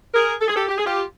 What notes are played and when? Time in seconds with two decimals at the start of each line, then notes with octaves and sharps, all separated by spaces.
0.14 G#4 A#4
0.41 A4
0.48 G#4
0.55 G4 A4
0.68 G4
0.77 G#4
0.85 F4 G4